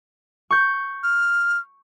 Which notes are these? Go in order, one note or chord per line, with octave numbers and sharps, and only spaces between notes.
C#6 G6
F6